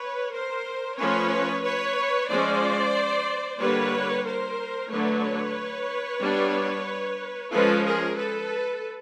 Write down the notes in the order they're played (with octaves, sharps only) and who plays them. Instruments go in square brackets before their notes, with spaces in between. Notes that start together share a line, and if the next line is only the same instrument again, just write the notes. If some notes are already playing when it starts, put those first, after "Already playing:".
Already playing: [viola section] B4 C#5
A#4 C5
F3 A3 C#4 B4 C#5
B4 C#5
F3 G#3 C#4 C5 D5
D3 G3 A#3 B4 C#5
A#4 C5
D3 F#3 A3 B4 C#5
G3 B3 D4
F3 G#3 C#4 A4 B4
G#4 A#4
A4 B4